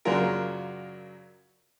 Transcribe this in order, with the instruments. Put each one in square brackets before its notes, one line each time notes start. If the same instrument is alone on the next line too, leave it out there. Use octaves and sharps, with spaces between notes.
[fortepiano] F#2 C#3 F#3 D4 F4 A#4